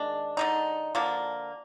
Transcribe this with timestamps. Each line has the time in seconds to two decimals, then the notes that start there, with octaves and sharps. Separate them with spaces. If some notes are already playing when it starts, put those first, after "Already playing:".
Already playing: D#3 G#3 D4
0.37 D3 G#3 D#4
0.95 D3 F3 A#3